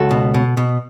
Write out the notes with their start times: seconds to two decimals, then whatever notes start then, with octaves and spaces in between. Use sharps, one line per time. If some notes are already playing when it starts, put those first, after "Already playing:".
Already playing: C#2 F#4 A4
0.11 B2
0.34 B2
0.57 B2